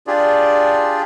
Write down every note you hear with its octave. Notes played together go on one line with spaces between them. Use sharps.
D4 F4 G4 G#4 D5